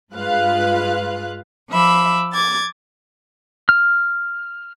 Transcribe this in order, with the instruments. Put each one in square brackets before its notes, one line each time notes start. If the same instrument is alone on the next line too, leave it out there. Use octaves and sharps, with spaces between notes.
[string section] G2 G#3 F4 B4 F5 F#6
[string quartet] F3 E5 B5 D6
D6 G#6 A6
[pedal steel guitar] F6